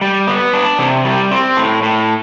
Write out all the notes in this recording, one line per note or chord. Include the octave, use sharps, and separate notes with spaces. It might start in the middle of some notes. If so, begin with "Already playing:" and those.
G3
B3
D4
C3
G3
C4
A2
A2